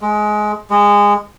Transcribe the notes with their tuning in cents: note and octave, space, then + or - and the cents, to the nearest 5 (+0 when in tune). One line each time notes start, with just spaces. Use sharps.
G#3 +20
G#3 -20